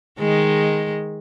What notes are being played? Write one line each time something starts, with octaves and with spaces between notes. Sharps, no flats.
D#3 G#3